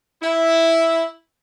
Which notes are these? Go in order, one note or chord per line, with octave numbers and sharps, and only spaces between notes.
E4